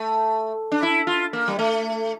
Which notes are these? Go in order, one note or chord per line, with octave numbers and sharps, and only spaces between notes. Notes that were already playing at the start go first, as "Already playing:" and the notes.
Already playing: A3
D4
E4
F4
A#3
G3
A3